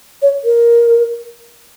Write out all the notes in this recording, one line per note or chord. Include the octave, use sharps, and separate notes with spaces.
C#5
A#4